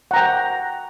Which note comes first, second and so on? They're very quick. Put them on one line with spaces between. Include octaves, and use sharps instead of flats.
F#5 A#5 G5